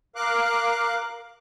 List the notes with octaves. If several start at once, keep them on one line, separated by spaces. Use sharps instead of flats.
A#4 F5 D6 F#6